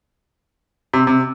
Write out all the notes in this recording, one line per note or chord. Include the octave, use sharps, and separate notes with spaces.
C3
C3